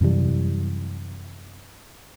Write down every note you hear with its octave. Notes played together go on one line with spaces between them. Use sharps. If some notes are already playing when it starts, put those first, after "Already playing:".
F#2 C3 E3 G3